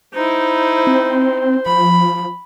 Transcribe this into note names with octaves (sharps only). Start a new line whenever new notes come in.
D#4 E4 C5
C4
F3 B5